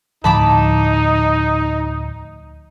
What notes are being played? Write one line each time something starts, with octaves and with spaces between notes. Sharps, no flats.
D2 A2 F3 D#4 A5 B5 D6